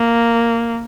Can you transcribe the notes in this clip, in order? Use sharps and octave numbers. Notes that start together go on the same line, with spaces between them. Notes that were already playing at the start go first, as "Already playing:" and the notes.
Already playing: A#3